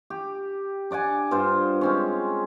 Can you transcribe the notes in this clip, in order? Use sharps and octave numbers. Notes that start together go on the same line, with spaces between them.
G4
D4 D5 F#5 G#5
G2 F4 C5
G#3 C4 C#4